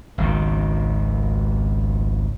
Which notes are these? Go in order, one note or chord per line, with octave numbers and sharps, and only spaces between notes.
G#1 C#2 D#3